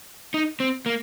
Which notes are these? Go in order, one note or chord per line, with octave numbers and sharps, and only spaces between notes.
D#4
C4
A#3